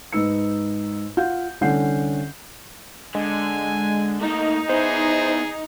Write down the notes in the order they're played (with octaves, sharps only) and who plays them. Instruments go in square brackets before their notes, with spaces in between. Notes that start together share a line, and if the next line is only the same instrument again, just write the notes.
[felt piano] G#2 D#4 B4 E6 C#7
F4 F#5 G6
C2 D3 C#4 F#5 G6 C7
[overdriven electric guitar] D3 [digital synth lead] G#3 [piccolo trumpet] G#5
[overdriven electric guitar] A3 A#3 [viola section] D#4
[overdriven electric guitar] B3 E4 [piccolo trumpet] G#4 [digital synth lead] C5